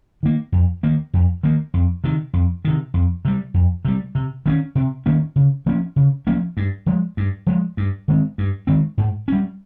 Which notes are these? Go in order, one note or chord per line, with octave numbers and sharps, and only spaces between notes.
D#3 A#3
F2
D#3 A#3
F2
D#3 A#3
F2
C3 D#3
F2
C3 D#3
F2
C3 G3
F2
C3 G3
C3
D#3 A#3 C#4
C3
D#3 A#3 C#4
C#3
F3 A#3 C#4
C#3
F3 A#3 C#4
G2
F3 G#3
G2
F3 G#3
G2
D#3 G#3 C4
G2
D#3 G#3 C4
G#2
G3 C#4